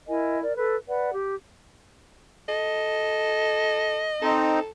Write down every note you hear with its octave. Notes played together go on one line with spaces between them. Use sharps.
E4 A#4 D#5 G#5
A#4 D5
A4 B4
B4 D5 F#5
G4
A4 D#5
C4 D#4 A4